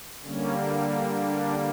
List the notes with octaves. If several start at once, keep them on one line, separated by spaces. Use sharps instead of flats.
D3 G3 A#3 C#4
D4